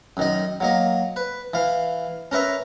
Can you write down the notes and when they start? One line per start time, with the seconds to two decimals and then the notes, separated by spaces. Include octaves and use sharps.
0.17 F#2 D#3 D#5
0.60 F#3 A#3 D#5
1.16 B4
1.54 E3 F5
2.32 C#4 A#4 B4 E5 A#5